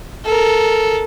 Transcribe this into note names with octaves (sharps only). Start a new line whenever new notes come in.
A4 A#4